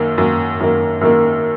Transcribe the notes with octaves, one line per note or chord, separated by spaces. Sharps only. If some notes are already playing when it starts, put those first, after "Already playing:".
Already playing: F#2 D#3 A#3
F#2 D#3 A#3
F#2 D#3 A#3
F#2 D#3 A#3